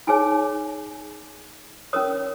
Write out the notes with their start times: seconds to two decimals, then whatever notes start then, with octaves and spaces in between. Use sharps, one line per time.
0.07 D#4 G#4 C#5 G#5
1.93 C#4 A#4 C#5 D#6